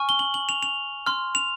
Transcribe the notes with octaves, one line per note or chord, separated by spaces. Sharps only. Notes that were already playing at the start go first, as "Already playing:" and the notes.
Already playing: G#5 C#6 F6
G7
F#7
F#7
F7
F7
C6 F6
F7